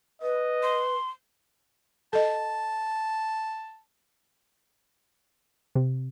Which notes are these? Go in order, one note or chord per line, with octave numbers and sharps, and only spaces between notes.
B4 D#5
C6
A4 D#5 A5
C3